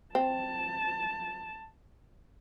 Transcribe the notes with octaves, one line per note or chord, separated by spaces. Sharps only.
C4 A5